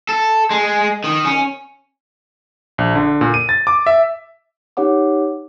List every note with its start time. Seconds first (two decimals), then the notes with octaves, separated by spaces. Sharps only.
0.09 A4
0.51 G#3
1.04 D#3
1.25 C#4
2.78 A#1
2.95 D3
3.21 A#2
3.34 D#7
3.49 A6
3.67 D6
3.86 E5
4.77 D#4 G4 C#5 F#5 D6